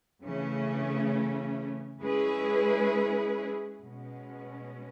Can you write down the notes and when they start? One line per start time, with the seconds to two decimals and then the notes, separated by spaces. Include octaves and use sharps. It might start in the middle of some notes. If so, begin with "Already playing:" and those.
0.24 C#3 E3 A3 C#4
2.02 G#3 C#4 E4 G#4 B4
3.81 B2 G#3 C#4